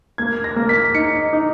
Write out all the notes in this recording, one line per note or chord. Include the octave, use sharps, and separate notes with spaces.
A#3 G#6
A#6
A#3
B6
D#4 C#7
D#4